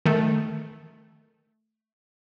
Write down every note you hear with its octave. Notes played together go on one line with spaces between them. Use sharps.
D#3 A3